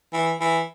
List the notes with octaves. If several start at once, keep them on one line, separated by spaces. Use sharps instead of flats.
E3
E3